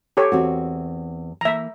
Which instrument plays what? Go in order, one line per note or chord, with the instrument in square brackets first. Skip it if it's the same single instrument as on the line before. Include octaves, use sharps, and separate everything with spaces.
[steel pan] G4 A4 C#5
[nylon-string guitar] E2 C4 F#4
[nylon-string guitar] E3 A#3 [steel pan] E5 A#5